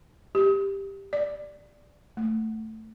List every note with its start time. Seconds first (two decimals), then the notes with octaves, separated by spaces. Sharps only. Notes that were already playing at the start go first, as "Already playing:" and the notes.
0.35 G4
1.13 D5
2.17 A3